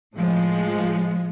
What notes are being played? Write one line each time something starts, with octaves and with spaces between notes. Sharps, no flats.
A2 F3 G#3